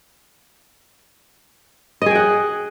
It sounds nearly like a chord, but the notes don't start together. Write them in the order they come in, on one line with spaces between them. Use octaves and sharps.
D#5 G#4 G5 F#5